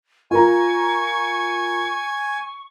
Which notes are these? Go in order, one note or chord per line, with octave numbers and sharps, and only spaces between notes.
F4 A#4 G#5 A#5 C#6